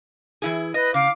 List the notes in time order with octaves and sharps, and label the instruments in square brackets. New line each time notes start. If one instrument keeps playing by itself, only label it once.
[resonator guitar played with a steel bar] E3 E4 G#4
[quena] B4 [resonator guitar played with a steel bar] D#5 [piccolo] A#6
[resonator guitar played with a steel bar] C#3 [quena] F5 [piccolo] D6